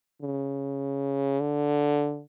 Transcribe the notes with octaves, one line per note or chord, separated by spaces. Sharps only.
C#3
D3